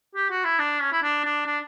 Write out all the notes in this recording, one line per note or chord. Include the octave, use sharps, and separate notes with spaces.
G4
F#4
E4
D4
C#4
E4
D4
D4
D4